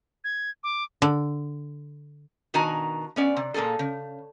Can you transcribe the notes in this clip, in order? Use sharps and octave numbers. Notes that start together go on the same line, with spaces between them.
G#6
D6
D3
B2 D#3 D4 F#4 G#5 A#5
B3 C#4 D5
C3
A#2 A#3 E4 G#4 A4
C#3